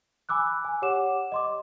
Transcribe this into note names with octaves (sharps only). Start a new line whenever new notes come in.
G#5 B5 D6 E6 F#6
G#5
G4 C#5 F#5 D6 E7
D#5 C6 D6